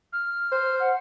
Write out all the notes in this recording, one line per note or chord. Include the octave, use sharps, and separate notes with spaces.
F6
C5
F#5